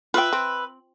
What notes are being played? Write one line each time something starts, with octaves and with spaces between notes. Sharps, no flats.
F4 B4 E5 G5
C4